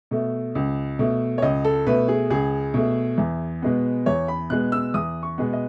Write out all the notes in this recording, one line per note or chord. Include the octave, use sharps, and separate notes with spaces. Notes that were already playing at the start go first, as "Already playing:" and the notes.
B2 A3
C#2
B2 A3
C#5
C#2 D#5
A4
B2 A3 B4
G#4
C#2 G#4
B2 A3
E2
B2 G#3 B3
E2 C#5
B5
B2 G#3 B3 F#6
E6
E2 D#6
C#6
B2 G#3 B3
D#5